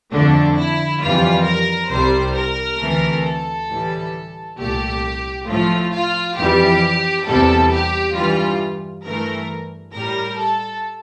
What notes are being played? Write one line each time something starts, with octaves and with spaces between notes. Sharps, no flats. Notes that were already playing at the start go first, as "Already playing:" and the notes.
F2 D3 A3 D4
E4
F2 E3 G3 F4
A#4
C2 C3 G3 C5
A#4
D2 C3 E3 A3
A4
A2 E3 G3
C2 A#2 A3 G4
A2 F3 A3 F4
F4
F2 E3 G3 G4
E2 C3 G3 A4
G4
G2 E3 G3 F4
G2 E3 A3 A#4
A2 G3 A#4
A4